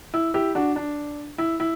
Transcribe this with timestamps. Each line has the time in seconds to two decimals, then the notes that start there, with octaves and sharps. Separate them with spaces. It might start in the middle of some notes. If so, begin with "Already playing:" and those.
0.14 E4
0.34 E4 G4
0.55 D4 F#4
0.76 D4
1.38 E4
1.60 E4